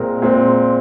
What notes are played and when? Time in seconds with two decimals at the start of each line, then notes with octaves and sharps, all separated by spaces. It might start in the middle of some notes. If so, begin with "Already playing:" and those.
Already playing: A#2 G#3 C4 A#4
0.22 A#2 G#3 C4